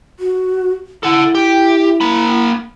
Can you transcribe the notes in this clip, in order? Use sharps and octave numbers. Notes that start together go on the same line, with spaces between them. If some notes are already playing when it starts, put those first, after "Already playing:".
F#4
E4 A4 F#5
G4
A#3 B5